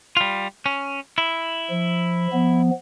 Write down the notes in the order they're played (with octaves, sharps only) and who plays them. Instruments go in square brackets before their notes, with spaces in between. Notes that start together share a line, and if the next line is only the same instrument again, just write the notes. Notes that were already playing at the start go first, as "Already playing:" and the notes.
[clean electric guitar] G3 F4
C#4
E4
[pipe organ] F3
F3 B3